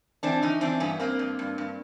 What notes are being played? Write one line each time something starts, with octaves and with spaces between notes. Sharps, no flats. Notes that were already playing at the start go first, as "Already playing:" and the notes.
E3 C4 D4
E3 C#4 D#4
E3 C4 D4
G2 B3 C#4
G2 A#3 C4
G2
G2
G2